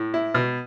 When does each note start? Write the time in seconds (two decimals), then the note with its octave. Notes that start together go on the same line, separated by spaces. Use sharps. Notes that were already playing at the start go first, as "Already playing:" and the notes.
Already playing: A2
0.14 E4
0.35 B2